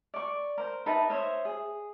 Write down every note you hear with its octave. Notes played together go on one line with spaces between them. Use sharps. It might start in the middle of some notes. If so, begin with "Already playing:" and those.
D5 C#6
A#4 C5
D#4 B4 E5 A5
C5 C#5 D#5 E5
G#4